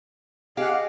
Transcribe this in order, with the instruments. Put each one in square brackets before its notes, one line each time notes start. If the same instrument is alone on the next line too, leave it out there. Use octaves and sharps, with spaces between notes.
[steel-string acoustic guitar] G4 [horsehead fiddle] G#4 [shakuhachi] D#5 [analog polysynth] F5 F#5